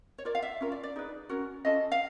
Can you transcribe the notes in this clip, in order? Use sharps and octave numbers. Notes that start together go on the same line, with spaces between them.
C#5
F4 A#4 D5
F5
E5
C#4 F4 A#4
D5
D5
D#4 G#4 B4
C#4 F#4 A#4
C#4 F4 A4 D#5
F5